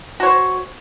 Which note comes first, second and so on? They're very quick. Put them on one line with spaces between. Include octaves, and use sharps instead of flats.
F#4 C#5 C5